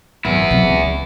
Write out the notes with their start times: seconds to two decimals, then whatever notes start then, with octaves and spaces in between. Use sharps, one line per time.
0.25 G#1 F#2 B3 E4
0.51 C3 F#3
0.70 C#2